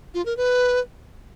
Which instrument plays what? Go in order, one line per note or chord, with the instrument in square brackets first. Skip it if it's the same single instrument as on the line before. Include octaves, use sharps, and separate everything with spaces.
[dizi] F4
A#4
B4